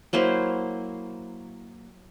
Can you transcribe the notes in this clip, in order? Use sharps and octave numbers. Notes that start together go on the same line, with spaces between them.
F#3 A#3 E4 C5